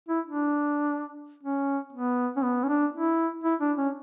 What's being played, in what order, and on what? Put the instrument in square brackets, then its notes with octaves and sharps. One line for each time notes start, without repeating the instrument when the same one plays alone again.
[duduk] E4
D4
C#4
B3
C#4
B3
C#4
D4
E4
E4
D4
C#4